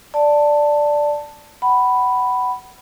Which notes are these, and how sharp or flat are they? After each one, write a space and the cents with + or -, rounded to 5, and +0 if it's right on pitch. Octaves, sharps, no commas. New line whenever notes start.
D5 +0 A5 +10
F#5 +25 B5 +0